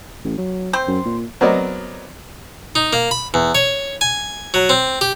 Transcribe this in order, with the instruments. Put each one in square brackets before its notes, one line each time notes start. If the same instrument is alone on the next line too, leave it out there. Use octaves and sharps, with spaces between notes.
[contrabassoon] A1
F#3
[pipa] C4 C5
[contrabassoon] F#2
A#2
[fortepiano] F#3 B3 C4 A#4 D5 D#5
[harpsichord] D#4
A#3
B5
E2
C#5
G#5
F#3
C4
G4